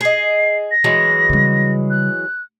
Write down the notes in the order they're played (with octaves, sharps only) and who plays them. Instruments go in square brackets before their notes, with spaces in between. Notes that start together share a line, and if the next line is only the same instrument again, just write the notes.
[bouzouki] G#4 D#5 [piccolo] C7
[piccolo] A#6
[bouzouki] E3 F#3 G#3
[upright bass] C#3 G3
[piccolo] F#6